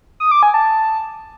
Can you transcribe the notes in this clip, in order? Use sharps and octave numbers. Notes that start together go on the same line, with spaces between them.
D#6
D6
G#5
A5